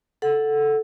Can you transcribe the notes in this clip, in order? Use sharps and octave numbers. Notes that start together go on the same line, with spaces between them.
A4 F#5